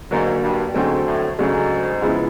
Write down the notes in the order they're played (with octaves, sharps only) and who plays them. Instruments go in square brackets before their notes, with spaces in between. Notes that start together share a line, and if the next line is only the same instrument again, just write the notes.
[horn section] G#2 [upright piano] D3 F#3 A#3 D4
[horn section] G2
[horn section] G#2 [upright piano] D3 F#3 A3 C4
[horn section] A2
[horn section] G#2 [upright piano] C#3 F#3 A3 D4
[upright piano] C#3 F3 G#3 B3 E4